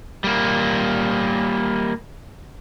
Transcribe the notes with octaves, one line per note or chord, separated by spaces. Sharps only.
G3 A#3